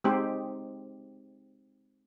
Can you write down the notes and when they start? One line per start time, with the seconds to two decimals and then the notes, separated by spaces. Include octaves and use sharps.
0.04 G#3 C4 D#4 G4 C5